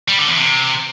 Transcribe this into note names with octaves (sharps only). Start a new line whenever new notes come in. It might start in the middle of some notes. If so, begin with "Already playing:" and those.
G3
D3
E2
C3